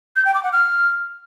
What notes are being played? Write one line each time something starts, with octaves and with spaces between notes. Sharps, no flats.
G6
G5
D6
F#5
F6